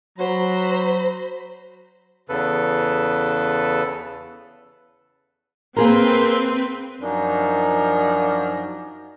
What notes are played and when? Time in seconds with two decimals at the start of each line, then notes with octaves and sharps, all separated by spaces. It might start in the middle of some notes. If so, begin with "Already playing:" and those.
0.18 F#3 C5 A#5 B5
2.29 E2 C#3 A4 B4
5.76 A#3 C4 G#4 A#4 B4 C6
7.02 F#2 F3 D4 D#4 A#4